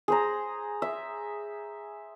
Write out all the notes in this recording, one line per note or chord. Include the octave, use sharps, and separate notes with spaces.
G#4 C5 A#5
E5